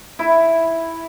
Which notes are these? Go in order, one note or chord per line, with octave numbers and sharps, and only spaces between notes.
E4